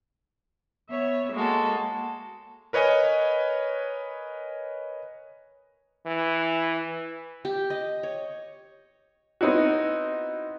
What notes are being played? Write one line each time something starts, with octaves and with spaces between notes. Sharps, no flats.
B3 C#5 E5
G#3 A#3 F#4 A4
A#4 B4 C#5 D#5 G#5
E3
G4
D#5
C#5
B3 C4 D#4 E4 F#4